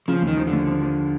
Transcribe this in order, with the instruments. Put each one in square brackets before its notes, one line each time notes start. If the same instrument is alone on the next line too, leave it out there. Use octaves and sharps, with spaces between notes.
[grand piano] C#3 [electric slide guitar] F3
[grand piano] D#2
[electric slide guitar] D#3
[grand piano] F3
[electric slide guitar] D3
[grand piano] D#2
F3
F3